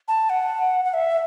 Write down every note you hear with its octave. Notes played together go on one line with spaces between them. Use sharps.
A5
F#5
F#5
E5